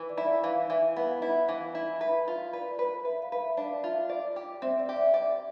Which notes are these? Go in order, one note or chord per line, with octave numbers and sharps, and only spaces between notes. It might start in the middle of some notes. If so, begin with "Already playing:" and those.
Already playing: E3
D5
E4
E5
E3 F5
E3 E5
B3 F5
E4 E5
E3 F5
E4
B4 E5
F4
B4 D5
B4
B4 E5
F5
B4
E5
D4 F5
F4 E5
D5
G4
C4 E5
D5
G4
E5
D5 E5